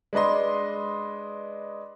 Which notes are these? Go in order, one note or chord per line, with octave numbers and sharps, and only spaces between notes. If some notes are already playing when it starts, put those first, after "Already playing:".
G#3 D4 B4 D#5 C6